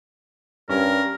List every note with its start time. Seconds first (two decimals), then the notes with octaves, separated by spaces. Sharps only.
0.69 G2 C#4 A#4